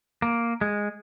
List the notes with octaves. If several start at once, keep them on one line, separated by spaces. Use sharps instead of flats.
A#3
G#3